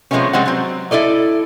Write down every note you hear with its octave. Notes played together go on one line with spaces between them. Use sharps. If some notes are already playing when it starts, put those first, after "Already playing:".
C3 F3 G#3 A3 B3 C#4
G3 G#3 C4 F#5
F#3 C4
E4 A4 D5 D#5